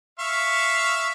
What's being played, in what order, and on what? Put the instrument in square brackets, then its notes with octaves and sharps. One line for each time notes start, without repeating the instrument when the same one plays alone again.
[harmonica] E5 F5 C#6